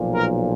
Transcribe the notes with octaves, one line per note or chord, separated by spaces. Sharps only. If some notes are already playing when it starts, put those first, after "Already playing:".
Already playing: B1 A#2 F3
A#4